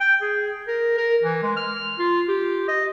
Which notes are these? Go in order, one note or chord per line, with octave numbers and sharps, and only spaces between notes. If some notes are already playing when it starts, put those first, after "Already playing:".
G5
G#4
A#4
A#4
E3
G#3
F6
F4
G4
D#5